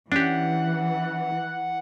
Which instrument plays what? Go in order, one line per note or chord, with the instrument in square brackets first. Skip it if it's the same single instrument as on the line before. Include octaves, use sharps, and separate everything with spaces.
[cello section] E3 [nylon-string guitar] C#4 [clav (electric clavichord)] D4 G4 [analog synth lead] F#5